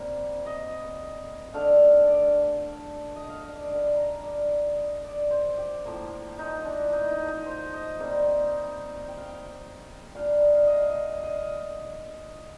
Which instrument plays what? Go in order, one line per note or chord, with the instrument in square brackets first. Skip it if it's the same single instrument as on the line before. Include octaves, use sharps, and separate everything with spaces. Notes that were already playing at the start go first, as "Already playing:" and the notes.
Already playing: [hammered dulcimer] C3 G3 A#3
D#5
D3 A3 D4 F5
D5
D#5
F5
D#5
D5
D3 G3 D4
A#4
D5
D#5
D5
C5
G4
A2 F3 A#3
D#4
D4
D#4
D#4
D#4
C5
D#5
C3 D#3 G3 A#3
G5
F5
G5
A#2 G3 D4 F5
D#5
F5
D#5
F5
D#5
D#5